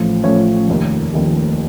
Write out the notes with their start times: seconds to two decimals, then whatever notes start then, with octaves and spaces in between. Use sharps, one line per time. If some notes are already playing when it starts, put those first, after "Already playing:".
Already playing: A1 A2 F3
0.23 A1 A2 F3 C#4 C#5
0.68 F1 D#2 D#3
1.14 F1 D#2 D#3